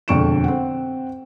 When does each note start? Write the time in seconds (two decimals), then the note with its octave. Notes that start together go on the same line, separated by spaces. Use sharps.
0.08 E1 F2 D3 C#6 D7 E7
0.44 C4 F#5